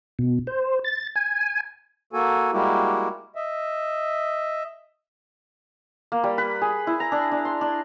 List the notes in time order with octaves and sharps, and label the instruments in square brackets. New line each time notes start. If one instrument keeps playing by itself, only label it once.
[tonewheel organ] B2
C5
A6
G#5
[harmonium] A#3 F#4 A4 G#5
G3 G#3 A#3 E4 F#4 G4
D#5 E5
[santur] A#3
G3
B4
G#4
E4
A#5
D4
D4
C6
D4